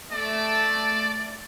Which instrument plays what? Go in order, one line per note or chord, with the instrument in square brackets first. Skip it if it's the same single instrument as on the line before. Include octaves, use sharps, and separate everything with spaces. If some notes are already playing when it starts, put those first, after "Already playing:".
[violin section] A3 E6 [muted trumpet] D5